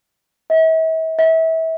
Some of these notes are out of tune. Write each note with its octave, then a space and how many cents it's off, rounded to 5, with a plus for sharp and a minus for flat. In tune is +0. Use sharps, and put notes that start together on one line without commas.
E5 -40
E5 -30